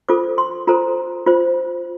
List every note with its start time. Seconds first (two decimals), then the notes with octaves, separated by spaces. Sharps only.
0.09 F4 A4 C5 D6
0.38 C6
0.68 F4 A4 C5 A#5
1.27 F4 C5